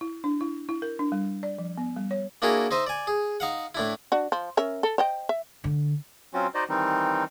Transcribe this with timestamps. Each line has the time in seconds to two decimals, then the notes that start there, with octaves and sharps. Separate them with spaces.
0.01 E4
0.24 D4
0.41 E4
0.69 E4
0.82 A#4
0.99 D4
1.12 G3
1.43 D5
1.58 F3
1.78 B3
1.96 G3
2.11 C#5
2.42 A#3 D4 E4 F#4 G#4 A#4
2.71 D#4 C5 D#5 E5
2.87 D5 G#5
3.07 G#4
3.40 D#4 F5 F#5
3.75 A2 D4 E4
4.12 D4 F#4
4.32 F3
4.57 C#4 A#4 E5
4.83 A4
4.98 C5 D#5 G5
5.29 E5
5.64 D3
6.34 F#3 C4 C#4 F4 F#4
6.55 D#4 F#4 C5 D5 D#5
6.69 D#3 E3 G3 C4 D#4